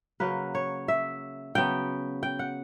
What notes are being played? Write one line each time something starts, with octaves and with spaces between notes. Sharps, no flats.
C#3 F#3 A#3 B4
C#5
E5
C#3 F#3 B3 G5
G5
F#5